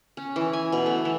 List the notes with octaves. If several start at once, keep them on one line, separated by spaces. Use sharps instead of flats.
C#4
E3
G#5
B2
A3
E3